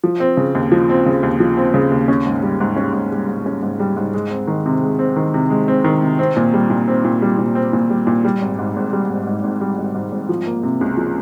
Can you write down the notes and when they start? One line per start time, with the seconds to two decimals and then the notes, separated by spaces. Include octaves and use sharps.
0.04 F3
0.20 C4
0.37 C#3
0.55 D#2
0.72 F3
0.89 C4
1.06 C#3
1.23 D#2
1.40 F3
1.57 C4
1.74 C#3
1.92 D#2
2.08 C#4
2.26 G#2
2.43 G3
2.60 G#2
2.76 C#4
2.94 G#2
3.12 G3
3.28 G#2
3.46 C#4
3.63 G#2
3.80 G3
3.97 G#2
4.14 G#3
4.31 C4
4.47 D#3
4.66 C3
4.82 G#3
4.99 C4
5.16 D#3
5.34 C3
5.50 G#3
5.68 C4
5.84 D#3
6.02 C3
6.19 C4
6.37 A#2
6.54 G3
6.70 A#2
6.88 C4
7.04 A#2
7.22 G3
7.38 A#2
7.55 C4
7.73 A#2
7.90 G3
8.07 A#2
8.25 G3
8.42 G#1
8.59 G#2
8.76 G#1
8.93 G3
9.09 G#1
9.27 G#2
9.44 G#1
9.61 G3
9.78 G#1
9.95 G#2
10.12 G#1
10.29 F3
10.47 A#3
10.63 C3
10.81 C#2
10.97 F3